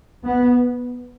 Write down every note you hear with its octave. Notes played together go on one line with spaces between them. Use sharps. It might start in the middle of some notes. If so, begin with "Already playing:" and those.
B3